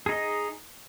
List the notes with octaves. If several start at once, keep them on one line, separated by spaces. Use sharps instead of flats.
D#4 G#4 D#5